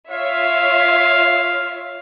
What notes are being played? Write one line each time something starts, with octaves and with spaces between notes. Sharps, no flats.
F4 C#5 E5 F5